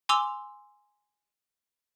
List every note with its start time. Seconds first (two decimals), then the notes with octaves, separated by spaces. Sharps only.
0.09 G#5 C6 D6 E6 F7